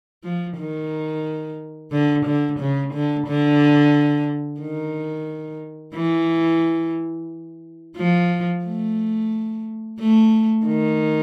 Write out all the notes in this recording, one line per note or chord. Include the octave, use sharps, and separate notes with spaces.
F3
D#3
D3
D3
C#3
D3
D3
D#3
E3
F3
A3
A3
D#3